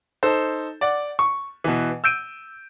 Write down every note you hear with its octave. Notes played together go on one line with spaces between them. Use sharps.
D#4 A4 C5
D5 F#5
C#6
B2 E3
E6 G6 D7 D#7